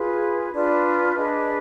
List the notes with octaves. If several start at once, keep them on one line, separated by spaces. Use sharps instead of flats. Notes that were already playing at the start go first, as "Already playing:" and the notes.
Already playing: F4 G#4 B4
D4 F4 B4 D5
D4 G#4 B4 D#5